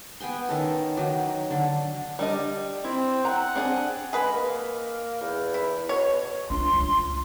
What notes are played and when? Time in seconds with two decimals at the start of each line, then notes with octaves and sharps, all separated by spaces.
0.20 B3 G5 G#5 C6
0.49 D#3 C#4 A4
0.97 D#3 F#3
1.51 D3
2.19 G3 D4 D#5
2.84 C4 E4
3.25 F#5 A#5
3.56 C4 D4 G#4
4.13 G#3 G#4 B4
4.33 A#3
5.21 E2
5.54 E4
5.89 B2 C#5
6.50 D4 F4 C6
6.73 C#2